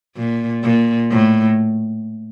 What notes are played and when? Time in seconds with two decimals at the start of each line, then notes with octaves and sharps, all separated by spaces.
0.16 A#2
0.63 A#2
1.11 A2